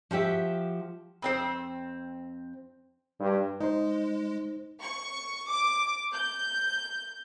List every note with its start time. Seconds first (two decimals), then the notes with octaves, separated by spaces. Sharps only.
0.11 F3 F#4 G4 E5
1.22 F2 C4 C5
3.19 G2
3.61 G#3 D#4 C5
4.83 C#6
5.49 D6
6.13 G6